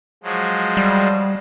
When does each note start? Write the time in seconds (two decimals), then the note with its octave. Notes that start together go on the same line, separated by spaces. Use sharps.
0.23 F3 F#3 G#3
0.77 G3